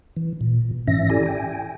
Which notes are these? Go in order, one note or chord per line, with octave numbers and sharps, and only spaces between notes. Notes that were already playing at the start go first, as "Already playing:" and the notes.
E3
A#2
G#2 E3 C#4 E5 A#6
E4 G4 A4 D5 G#5
G5 G#5